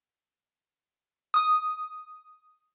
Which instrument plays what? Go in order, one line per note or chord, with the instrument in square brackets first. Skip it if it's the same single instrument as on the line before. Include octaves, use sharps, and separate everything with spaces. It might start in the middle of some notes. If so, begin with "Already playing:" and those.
[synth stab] D#6